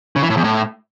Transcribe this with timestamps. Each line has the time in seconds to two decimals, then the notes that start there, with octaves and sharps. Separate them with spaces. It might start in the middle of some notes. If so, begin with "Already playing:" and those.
0.16 C#3
0.23 E3
0.30 A2
0.37 E2
0.44 A2